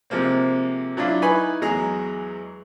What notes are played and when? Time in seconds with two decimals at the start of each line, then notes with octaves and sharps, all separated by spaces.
0.10 C3 F3 G#3 A#3 C4
0.97 F#3 D4 E4 F4
1.22 D#4 E4 B4 G#5 B5 C#6
1.61 E2 F#3 G#3 G#4 A#5